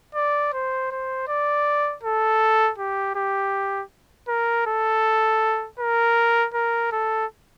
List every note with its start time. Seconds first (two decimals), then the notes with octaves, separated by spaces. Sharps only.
0.15 D5
0.53 C5
0.91 C5
1.28 D5
2.03 A4
2.78 G4
3.15 G4
4.28 A#4
4.67 A4
5.80 A#4
6.54 A#4
6.92 A4